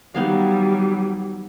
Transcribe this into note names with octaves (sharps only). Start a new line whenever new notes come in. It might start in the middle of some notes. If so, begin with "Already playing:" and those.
D#3 F#3 G3 B3 F5